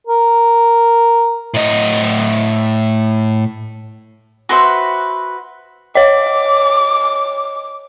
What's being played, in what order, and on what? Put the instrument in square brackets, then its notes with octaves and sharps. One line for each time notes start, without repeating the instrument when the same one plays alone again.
[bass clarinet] A#4
[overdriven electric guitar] A2 D#5
[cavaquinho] F#4 B4 C5 E5
[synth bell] C#5 D#5 [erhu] D6